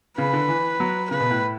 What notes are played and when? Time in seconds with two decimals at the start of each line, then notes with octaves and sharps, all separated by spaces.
0.18 C#3 B4
0.33 D3
0.49 E3
0.80 F#3
1.10 C#3 B4
1.20 B2
1.31 A2